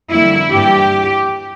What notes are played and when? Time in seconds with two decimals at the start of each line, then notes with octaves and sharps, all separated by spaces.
0.11 F2 D3 G3 A#3 E4
0.53 G2 E3 G3 G4